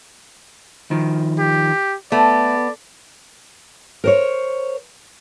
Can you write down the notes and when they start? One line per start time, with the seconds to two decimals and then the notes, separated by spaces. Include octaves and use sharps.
0.91 D#3 F3
1.38 G4
2.12 A3 B3 D5
4.04 A#4 C5 C#5